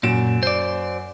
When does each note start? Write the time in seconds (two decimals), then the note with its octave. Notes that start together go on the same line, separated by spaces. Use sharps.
0.03 F#2 A#2 D7 E7
0.43 C5 D5